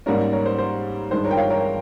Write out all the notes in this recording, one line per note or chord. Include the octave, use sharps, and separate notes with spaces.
G#2 G3 A#3 C#4 A#4
A#4 C#5
C5
C5
G2 D#3 G#3 C5
A#4 C#5
G5
C#5 F5
A#4 C#5